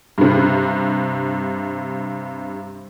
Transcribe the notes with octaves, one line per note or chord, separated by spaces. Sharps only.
G2 C3